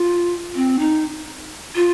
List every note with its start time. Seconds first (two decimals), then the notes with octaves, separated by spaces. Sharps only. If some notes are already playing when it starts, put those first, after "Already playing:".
Already playing: F4
0.56 C4
0.79 D#4
1.75 F4